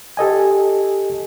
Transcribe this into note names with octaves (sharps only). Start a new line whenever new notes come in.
G4 A4 D#5 G#5